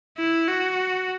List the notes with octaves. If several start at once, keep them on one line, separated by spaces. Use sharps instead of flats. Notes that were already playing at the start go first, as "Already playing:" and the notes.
E4
F#4